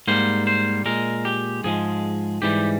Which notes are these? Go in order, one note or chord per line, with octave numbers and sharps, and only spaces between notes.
G#2 G3 A#3 C5
C5
A#2 G#3 A#4
G4
G#2 F3 G#3 G#4
G#2 E3 G3 G4